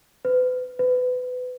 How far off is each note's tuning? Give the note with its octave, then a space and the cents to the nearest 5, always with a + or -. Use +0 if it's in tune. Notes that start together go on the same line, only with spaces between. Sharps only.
B4 +35
B4 +25